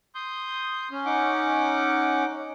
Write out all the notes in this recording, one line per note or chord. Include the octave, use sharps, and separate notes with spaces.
C6 D#6 G6
C#4
D#4 F#5 D6